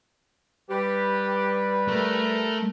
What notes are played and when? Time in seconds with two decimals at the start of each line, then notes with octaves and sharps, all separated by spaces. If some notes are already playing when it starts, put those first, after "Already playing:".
0.70 G3 G4 B4
1.88 A3 A#4